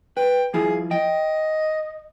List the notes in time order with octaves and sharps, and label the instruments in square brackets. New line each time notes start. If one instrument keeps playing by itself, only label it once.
[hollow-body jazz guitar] B4 [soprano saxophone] G5
[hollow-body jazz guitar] F3 E4 F4 [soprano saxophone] G#4
[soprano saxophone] D#5 [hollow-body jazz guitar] G5